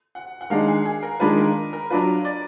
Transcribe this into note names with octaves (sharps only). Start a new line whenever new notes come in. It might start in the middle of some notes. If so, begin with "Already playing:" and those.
F#5
F#5
D#3 G#3 D4 F5
G#4
G#4
A#4
D#3 G#3 D4 F4 B4
A#4
A#4
F#3 D4 F4 B4
D5